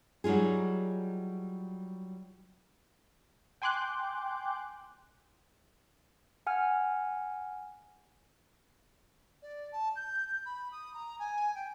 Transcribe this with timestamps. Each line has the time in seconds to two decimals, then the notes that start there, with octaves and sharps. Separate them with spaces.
0.24 F#3 G3 D#4 F4 G#4
3.62 G5 G#5 C6 D6 F#6 G6
6.47 F#5 G#5 F6
9.42 D5
9.72 A5
9.95 G6
10.45 B5
10.71 D#6
10.94 A#5
11.19 G#5
11.55 G5